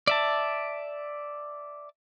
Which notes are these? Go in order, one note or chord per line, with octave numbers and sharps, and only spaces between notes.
D5 E5 A5